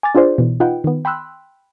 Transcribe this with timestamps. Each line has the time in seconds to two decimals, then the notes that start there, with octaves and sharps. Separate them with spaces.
0.03 G#5 D6 F6 A6
0.15 D4 F4 G#4 C5 D5
0.38 B2 E3
0.60 D#4 F4 B4 F#5 G5
0.84 D#3 B3
1.05 G5 B5 C6 E6 F#6